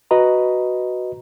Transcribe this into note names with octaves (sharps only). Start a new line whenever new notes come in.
F#4 B4 D#5 A#5